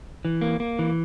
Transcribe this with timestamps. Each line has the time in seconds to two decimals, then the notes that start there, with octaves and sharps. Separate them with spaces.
0.25 E3
0.41 A#3
0.60 A#3
0.79 E3